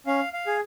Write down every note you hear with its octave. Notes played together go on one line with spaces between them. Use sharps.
C#4 F5
F5
G#4